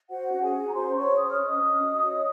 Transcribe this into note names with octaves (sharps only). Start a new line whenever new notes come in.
F#4 C5 F#5
C#4
G#4 G#5
F#4
A#5
C#4 C5 C6
C5 C#5 C#6
C5 D#6
F6
C#4
D#5 D#6
C#4
F#4
C#5